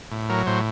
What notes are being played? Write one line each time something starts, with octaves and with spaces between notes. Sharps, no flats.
A2
F#3 A#4
A2 C5